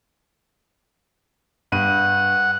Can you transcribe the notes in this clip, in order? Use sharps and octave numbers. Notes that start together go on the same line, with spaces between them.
G2 F#5 D#7